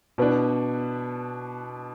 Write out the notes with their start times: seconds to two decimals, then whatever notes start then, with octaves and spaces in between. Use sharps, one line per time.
0.18 B2 B3 D4